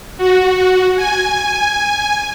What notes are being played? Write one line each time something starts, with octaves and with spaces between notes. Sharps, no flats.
F#4
G#5